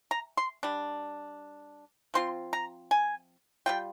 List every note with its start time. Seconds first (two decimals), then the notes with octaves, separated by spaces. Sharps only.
0.11 A#5
0.37 C6
0.63 G3 D4
2.14 F3 C4 F4 C6
2.53 A#5
2.91 G#5
3.66 G3 D4 F4 G5